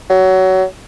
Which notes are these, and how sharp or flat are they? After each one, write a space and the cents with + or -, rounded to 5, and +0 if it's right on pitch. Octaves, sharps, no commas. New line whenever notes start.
F#3 +20